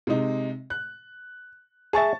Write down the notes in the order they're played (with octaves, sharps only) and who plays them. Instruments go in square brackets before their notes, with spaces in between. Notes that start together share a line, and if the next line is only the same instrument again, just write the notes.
[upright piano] C3 G#3 D#4
F#6
[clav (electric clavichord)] G#4 E5 [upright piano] A5 C#6 A6